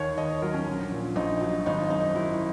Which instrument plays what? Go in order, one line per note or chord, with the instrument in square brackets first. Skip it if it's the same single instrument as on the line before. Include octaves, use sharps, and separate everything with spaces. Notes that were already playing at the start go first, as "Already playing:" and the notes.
Already playing: [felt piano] D#2 D#3 C#5
D#2 D#5
C#5
F#3 A#4
C#4
A#1
A#2
A#1 D#4
F#3
G#1 D#4
F#2 D#4
F#3 E4